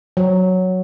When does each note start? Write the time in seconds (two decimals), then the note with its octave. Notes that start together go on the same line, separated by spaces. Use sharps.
0.17 F#3